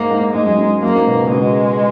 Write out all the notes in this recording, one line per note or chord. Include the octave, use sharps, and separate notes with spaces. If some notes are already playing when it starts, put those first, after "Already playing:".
Already playing: G#2 A#3
G#2
G#2 G#3
F#2
G#2
F#2 A#3
G#2
B2
C#3
B2 G#3